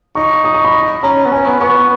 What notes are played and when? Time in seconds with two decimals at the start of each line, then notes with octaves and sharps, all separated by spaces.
0.15 D#4 C#6
0.44 D#6
0.54 C#6
0.65 B5
1.03 C#4 A#5
1.26 B3
1.32 C#4 G#5
1.46 B3 B5
1.61 B3 C#6